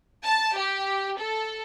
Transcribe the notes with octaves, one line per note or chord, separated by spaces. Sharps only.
A5
G4
A4